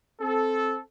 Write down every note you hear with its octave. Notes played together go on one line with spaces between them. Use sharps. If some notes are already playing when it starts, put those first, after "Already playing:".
C4 A4